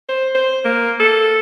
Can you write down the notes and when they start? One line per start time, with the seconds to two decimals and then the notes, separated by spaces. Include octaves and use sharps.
0.09 C5
0.35 C5
0.65 A#3
1.00 A4